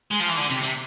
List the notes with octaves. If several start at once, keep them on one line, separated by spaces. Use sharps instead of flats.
G#3
F3
E3
D3
C3
C3